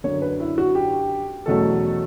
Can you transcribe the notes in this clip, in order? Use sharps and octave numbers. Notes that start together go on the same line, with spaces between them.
F#2 D3 F#3 C#5
B4
E4
F#4
G4
E2 B2 F#3 A3 C#4 A4